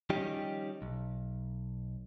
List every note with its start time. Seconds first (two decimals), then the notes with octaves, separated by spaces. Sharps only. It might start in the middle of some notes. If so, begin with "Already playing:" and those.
0.10 D#3 F3 G3 C#4 D#4 G4
0.82 B1